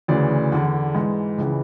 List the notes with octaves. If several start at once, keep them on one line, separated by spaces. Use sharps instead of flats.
D2 C#3 E3 D5
E2 D3
G#2 E3
C#2 C#3 E3